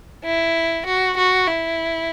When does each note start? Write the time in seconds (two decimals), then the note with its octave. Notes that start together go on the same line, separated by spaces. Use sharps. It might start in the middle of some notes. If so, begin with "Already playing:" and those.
0.25 E4
0.86 F#4
1.17 F#4
1.48 E4